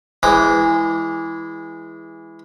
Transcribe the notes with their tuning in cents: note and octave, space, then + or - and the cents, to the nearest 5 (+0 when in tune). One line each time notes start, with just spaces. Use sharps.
E3 +0 G#3 -15 D6 +0